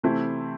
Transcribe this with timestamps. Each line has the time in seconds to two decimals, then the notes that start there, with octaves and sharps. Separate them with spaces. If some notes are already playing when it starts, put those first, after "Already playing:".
0.03 C3 E3 A3 C4 E4